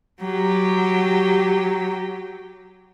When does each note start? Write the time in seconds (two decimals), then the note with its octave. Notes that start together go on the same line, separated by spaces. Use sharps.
0.22 F#3 G4